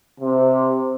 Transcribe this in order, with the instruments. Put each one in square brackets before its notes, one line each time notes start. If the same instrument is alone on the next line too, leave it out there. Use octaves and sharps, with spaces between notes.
[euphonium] C3